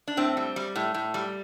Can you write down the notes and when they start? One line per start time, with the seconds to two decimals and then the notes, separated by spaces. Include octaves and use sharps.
0.08 D4
0.17 A2 C4
0.37 G3
0.56 G3
0.76 A2
0.94 A2
1.14 G3